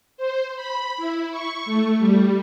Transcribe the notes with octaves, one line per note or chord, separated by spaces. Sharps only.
C5
B5
E4
C#6
A3
G3